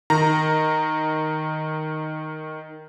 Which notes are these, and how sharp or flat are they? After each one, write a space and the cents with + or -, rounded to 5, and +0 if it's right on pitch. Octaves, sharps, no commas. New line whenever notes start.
D#3 +0 A#5 -10